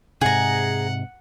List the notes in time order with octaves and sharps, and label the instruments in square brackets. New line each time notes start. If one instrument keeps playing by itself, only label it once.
[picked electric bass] G#2 C3 [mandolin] G#4 A#5 [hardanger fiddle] F#5